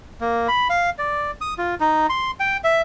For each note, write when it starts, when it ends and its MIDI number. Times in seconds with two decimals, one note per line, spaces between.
0.21 0.48 58
0.48 0.68 83
0.70 0.90 77
0.99 1.31 74
1.41 1.54 87
1.58 1.75 65
1.80 2.07 63
2.10 2.31 84
2.40 2.57 79
2.64 2.82 76